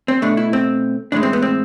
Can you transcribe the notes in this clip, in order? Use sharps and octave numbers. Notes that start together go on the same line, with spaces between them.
C4
B2 A3 D4
E4
C4
A2 E3 G#3 D4
C4
B3
C4